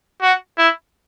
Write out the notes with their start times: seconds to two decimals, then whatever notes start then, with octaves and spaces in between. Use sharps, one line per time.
0.22 F#4
0.58 E4